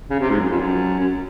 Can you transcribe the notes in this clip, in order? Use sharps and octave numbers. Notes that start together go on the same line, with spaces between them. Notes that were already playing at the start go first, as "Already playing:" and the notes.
C#3
C3
G#2
F#2
F2
F#2
F#2